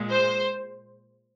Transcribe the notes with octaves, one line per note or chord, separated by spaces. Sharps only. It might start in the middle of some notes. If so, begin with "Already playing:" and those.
Already playing: A#2 G#3
C5